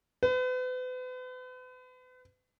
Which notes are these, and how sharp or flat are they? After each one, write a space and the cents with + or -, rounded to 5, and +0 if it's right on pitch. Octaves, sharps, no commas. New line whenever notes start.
B4 +40